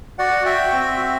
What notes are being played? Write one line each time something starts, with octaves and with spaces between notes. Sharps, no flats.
F#4 D5 F#5
F#4 E5 G5
C4
F#4